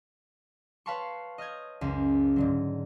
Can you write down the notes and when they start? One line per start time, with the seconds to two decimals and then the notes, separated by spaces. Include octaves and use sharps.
0.86 B4 C#5 F5 A5 C6 C#6
1.38 D#5 F6 G6 G#6
1.81 F#1 C#2
2.36 G#2 D3 F#3